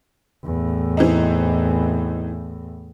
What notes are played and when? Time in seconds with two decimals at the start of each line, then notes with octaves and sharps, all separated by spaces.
0.44 E2 A2
0.97 E3 C4 D#4